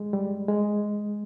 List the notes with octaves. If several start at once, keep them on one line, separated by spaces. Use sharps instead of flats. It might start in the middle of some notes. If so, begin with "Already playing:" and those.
Already playing: G#3
G3
G#3